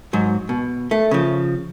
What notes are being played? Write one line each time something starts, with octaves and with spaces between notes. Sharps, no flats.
G#2 F#3
B2
A3
C#3 F3